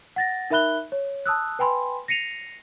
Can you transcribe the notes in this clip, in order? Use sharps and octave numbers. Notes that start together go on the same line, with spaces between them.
F#5 A6 A#6
D#4 A#4 E5 B5 F#6 G7
C#5
A5 D#6 E6 F#6
B4 G5 G#5 B5 C6
A#6 C7 C#7 D#7 F7